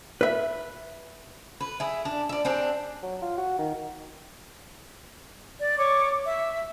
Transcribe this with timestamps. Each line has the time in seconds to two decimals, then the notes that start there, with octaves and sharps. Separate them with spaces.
0.21 B4 E5
1.61 B4
1.80 E4 G#4
2.05 D4
2.29 D5 E5
2.45 C4 D4 G4 G#4
3.03 F#3
3.22 F4
3.38 F#4
3.59 D#3
5.58 D5
5.77 C#5 C#6 D6
6.24 E5